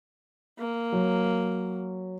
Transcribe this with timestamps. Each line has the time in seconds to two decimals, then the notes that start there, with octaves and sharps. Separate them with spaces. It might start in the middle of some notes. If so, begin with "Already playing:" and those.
0.59 A#3
0.92 F#3